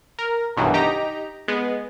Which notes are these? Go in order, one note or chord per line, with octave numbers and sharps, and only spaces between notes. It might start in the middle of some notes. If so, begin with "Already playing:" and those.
A#4
B1 G2 B2 D#3 E3 F#3
D#4 G4 A#5
G#3 B3